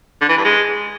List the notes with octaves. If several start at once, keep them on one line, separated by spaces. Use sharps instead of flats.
D3
E3
G2
G#3